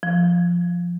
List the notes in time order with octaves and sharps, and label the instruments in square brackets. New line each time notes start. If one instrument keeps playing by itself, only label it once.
[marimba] F3